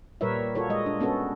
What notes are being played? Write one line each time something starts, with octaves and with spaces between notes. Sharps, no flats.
A#2 G3 A#4 B4 C#5 E5
F4 F#4 A4 A#4 C#5
G#3 D#5
D4
B3 C#4 F#4 A4